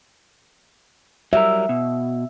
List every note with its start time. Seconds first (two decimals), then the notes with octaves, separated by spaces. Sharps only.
1.33 F#3 G3 A#4 E5
1.69 B2